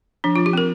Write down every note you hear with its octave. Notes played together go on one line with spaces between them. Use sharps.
F3 D4
F3 F4
G4
C4 A#4